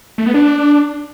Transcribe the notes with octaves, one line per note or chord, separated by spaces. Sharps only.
A3
B3
D4